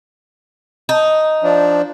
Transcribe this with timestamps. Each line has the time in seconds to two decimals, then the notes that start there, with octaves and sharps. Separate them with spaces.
0.89 D#4
1.43 F3 D4